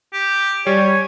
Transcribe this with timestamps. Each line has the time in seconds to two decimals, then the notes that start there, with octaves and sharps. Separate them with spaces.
0.13 G4
0.67 G3 C#5 G#5